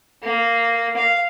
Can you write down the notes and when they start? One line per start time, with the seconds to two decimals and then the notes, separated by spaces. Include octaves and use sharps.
0.23 A#3
0.97 F5